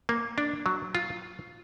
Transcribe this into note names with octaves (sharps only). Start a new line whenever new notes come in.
A#3
D4
F#3
F4